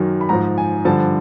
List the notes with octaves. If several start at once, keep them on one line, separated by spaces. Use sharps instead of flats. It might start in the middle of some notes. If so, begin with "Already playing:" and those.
Already playing: F#2 D#3 F#3
B5
G#2 F3 A#5
G#5
G2 D3 F3 A5